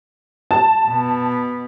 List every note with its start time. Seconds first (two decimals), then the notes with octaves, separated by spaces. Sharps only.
0.51 A5
0.89 B2